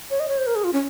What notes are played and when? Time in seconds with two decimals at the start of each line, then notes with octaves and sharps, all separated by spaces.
0.10 C#5
0.20 D#5
0.28 C#5
0.38 C5
0.47 A#4
0.56 G#4
0.64 F4
0.73 C#4